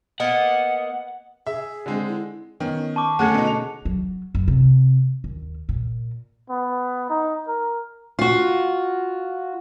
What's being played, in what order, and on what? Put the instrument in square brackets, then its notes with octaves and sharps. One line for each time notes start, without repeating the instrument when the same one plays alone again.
[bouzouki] A#3 B3 D#5 [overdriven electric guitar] F#5
[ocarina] G#4 [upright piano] E5
[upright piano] D3 G#3 C4
[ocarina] E4
[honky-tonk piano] D#3 [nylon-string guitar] B3 C#4
[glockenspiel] A5 C#6 D6
[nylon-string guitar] D3 A3 C#4 [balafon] A#3 G#4 F#5 [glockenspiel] F#6 C#7
[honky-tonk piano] B2 D#4
F7
[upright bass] F#3
F#1
C3
D#2
A#2
[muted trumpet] B3
D#4
A#4
[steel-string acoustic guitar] F4 F#4